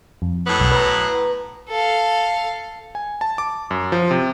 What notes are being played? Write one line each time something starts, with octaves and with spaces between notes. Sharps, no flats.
F2
A2 F#3 B3
B1
B4 A#5
A4 F5
G#5
A5
D6
F#2
F3
C3